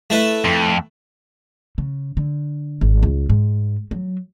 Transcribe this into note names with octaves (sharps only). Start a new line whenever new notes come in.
A3 E4 B4
F2
C#3
D3
G#1
C#2
G#2
F#3